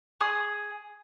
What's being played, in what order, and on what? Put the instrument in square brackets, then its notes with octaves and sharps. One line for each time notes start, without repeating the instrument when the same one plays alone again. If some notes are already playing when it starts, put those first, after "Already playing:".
[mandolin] G#4 D#6